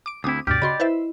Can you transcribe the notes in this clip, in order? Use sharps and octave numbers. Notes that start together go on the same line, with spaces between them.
D6 D7
D2 C4 E4 D6 D#6
D2 G2 B2 G4 D5 F6
C#3 F#4 D#5 B5 C6
E4 B4 C5 E5